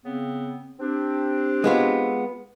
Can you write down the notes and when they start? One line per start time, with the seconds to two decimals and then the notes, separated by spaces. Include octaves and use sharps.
0.04 C#3 B3 C4
0.80 C4 D4 G4
1.64 G#3 B3 F4